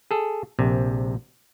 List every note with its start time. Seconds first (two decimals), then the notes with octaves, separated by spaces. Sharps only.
0.11 G#4 A4
0.59 A#1 C3